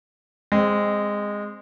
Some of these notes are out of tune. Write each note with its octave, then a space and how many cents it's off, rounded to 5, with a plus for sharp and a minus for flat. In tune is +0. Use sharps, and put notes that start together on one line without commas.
G#3 -15 C4 +0